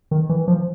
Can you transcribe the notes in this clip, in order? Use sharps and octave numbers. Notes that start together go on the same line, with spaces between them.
D#3
E3
F3